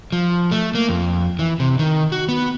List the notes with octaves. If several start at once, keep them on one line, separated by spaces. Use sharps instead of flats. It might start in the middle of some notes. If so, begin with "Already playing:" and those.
F3
A3
A#3
F2
E3
C3
D#3
F#4
B3